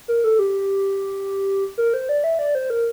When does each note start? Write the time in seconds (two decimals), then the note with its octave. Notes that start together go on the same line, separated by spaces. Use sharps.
0.08 A#4
0.24 A4
0.39 G4
1.78 A#4
1.94 C5
2.09 D5
2.24 E5
2.39 D5
2.55 C5
2.70 A#4